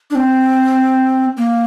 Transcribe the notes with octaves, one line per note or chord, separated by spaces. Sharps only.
D4
C4
A#3